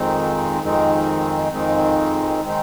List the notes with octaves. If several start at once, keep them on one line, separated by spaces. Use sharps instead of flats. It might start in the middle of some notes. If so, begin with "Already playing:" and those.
Already playing: F2 D#3 G#3 C4 D#4
F2 D#3 G#3 C4 D#4
F2 D#3 G#3 C4 D#4
D#3 G#3 C4 D#4